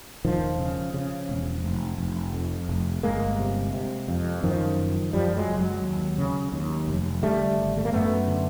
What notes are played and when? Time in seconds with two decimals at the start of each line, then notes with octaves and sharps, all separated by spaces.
0.25 E1 D#3 F3
0.59 C#3
0.94 C#3
1.29 E1
1.64 F1
1.98 F1
2.33 F2
2.69 F1
3.03 G1 G#3 A#3
3.39 C3
3.73 C3
4.08 F2
4.43 F#2 D#3 F3
4.79 F#1
5.13 F#2 F3 G3
5.36 F#3 G#3
5.48 F#1
5.59 F#3 G#3
5.83 D#2
6.18 C#3
6.52 D#2
6.88 F1
7.23 D3 G3 A3
7.58 G#1
7.77 A3
7.85 A#3
7.93 F#2 A3 B3
8.28 D3